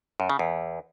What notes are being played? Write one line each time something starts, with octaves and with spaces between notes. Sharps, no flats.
F#2
C#3
E2